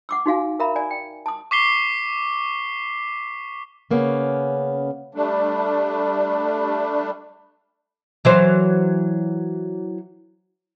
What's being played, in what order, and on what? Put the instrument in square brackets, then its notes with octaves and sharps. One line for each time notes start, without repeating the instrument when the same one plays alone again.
[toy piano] F#5 D6 E6
D#4 F#4 F5 G#5
A#4 E5 F5 A#5 B5
D5 G#5
G5
A5 D#6
[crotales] C#6 D6 B6 C7 G7
[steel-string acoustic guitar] C#3 A#3 B3 C#4 C#5
[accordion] G3 A3 D4
[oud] E3 F#3 C5